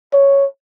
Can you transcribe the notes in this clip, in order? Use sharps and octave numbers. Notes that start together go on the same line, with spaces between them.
C#5